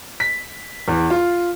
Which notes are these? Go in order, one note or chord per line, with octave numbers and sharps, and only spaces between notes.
B6
E2
F4